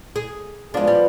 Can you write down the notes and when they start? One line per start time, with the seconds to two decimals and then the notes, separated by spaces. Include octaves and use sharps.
0.16 G#4
0.74 F3 G#3 B3 D4
0.87 G3